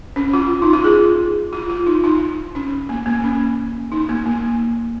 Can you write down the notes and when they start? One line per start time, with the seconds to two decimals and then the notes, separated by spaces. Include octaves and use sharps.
0.16 C#4
0.33 F4
0.62 D#4
0.73 F4
0.84 G#4
1.53 F4
1.70 F4
1.87 D#4
2.04 D#4
2.55 C#4
2.89 A#3
3.06 A#3
3.24 C#4
3.92 D#4
4.09 A#3
4.26 A#3